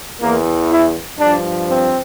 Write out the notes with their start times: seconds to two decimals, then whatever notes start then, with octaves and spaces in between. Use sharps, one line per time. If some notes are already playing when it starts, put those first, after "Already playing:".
0.21 E2 E3 A#3
0.70 E4
1.19 G2 F3 D4
1.68 C4